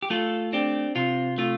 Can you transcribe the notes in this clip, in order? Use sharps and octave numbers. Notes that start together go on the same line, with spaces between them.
G4
A3 F4 A4
C4 D4 G4
C3 F4
A3 F4